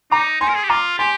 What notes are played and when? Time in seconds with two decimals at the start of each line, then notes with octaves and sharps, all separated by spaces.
0.11 D#4 A#5 D6
0.41 D#4 G#5 C6
0.49 A#4
0.55 G#4
0.63 G4
0.70 F4 A#5 D6
0.98 G4 G#5 C6